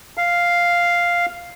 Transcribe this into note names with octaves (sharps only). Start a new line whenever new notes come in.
F5